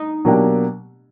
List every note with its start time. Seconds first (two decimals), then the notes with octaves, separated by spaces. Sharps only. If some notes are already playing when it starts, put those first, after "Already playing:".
Already playing: D#4
0.25 B2 F#3 A#3 D4 G4